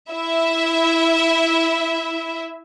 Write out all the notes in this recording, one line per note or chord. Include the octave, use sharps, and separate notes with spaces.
E4 E5